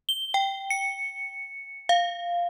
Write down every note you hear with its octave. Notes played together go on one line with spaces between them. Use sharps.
G7
G5
C#7
F5